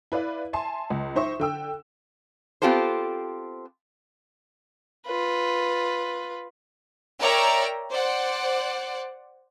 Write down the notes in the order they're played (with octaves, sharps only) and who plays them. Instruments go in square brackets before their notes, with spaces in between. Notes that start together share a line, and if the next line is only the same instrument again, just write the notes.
[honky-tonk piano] E4 B4 D5 F5
E5 G#5 A5 C6
C#2
D#4 C5 E5 C#6
D3 G5 E6
[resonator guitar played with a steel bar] B3 C4 F4 G4 A4 C5
[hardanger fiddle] F4 B4
[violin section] A#4 C#5 D5 E5 G5 A#5
C5 D5 F#5